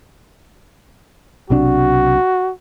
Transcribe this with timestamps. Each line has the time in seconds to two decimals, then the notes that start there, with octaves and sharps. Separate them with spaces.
1.50 B1 C3 D4 F#4